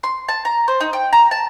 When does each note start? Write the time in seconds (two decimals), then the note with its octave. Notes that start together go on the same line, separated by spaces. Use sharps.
0.03 C6
0.29 A5
0.45 A#5
0.68 C5
0.81 D#4
0.93 G5
1.13 A#5
1.31 A5